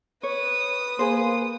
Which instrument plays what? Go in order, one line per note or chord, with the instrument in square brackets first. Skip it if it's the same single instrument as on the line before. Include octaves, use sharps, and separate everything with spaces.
[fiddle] B4 D#6 [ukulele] C#5
[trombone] A#3 [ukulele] G#4 C5